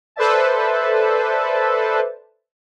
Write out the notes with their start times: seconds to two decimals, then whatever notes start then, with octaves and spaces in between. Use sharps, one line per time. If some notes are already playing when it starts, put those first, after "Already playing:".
0.16 A4 B4 C5 D5 E5 A5